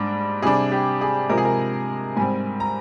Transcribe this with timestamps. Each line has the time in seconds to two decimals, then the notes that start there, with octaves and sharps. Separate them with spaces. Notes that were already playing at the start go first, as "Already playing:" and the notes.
Already playing: G#2 G3 D4
0.42 C3 G3 D4 G#4
0.72 G4
1.01 G#4
1.30 C3 F3 G#3 A#4
1.38 G#4
1.45 A#4
2.17 G#2 G3 C4 G#5
2.60 A#5